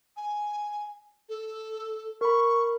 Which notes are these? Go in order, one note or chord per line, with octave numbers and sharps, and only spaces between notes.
G#5
A4
A#4 B5 C#6